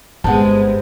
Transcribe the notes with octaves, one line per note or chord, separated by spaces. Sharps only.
G1 C3 G#3 B3 F#5 A5